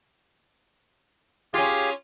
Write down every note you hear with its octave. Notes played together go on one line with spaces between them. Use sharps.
C#4 F4 G4 G#4 F5